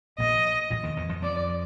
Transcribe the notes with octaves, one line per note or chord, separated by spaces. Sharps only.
A#1 A#2 D#5
A#1 A#2
D#2 D#3
E2 E3
F2 F3
F2 F3 D5